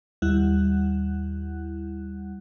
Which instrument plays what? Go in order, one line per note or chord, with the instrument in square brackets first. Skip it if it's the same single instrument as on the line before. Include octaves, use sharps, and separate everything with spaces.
[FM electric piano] D#2 G3 E4 F#5 F#6